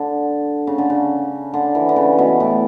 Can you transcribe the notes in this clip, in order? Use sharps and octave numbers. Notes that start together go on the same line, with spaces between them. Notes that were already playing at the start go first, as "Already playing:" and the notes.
Already playing: D3
C#3
D3
C#3
D3
E3
D3
C#3
B2
A2